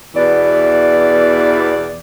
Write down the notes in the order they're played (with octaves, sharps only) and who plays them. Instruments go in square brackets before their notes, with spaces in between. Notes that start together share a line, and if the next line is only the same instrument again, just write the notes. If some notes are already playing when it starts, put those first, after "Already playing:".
[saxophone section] E2 B2 E3 D5